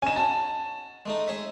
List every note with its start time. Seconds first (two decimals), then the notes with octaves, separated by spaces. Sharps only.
0.02 C#4 D#4 G#5 E7
0.16 F#4 A5
1.06 G#3 A3 D#4
1.28 G#4 C#5 E5